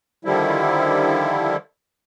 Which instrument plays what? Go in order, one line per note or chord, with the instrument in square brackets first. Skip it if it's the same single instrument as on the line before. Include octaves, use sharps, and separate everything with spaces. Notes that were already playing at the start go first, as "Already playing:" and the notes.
[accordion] D3 D#3 F3 G3 E4